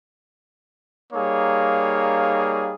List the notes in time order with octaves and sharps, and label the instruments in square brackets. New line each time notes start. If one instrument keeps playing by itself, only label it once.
[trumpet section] G3 A#3 D#4 G#4 C#5 F5